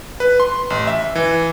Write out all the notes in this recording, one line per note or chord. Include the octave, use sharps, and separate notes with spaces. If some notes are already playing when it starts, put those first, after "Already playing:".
B4
C6
A1
E5
E3